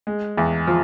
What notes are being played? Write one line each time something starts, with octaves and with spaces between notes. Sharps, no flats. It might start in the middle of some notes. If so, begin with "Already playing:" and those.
G#3
E2
F3